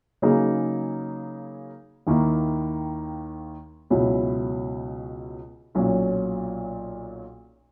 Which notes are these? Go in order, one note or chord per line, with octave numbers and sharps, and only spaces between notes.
C#3 F#3 A#3 D#4 G#4
D#2 D#3 A#3 E4
C#2 B2 F#3 C#4 E4
B1 A#2 F#3 C#4